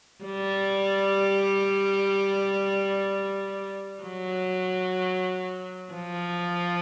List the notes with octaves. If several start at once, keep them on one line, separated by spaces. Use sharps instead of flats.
G3
F#3
F3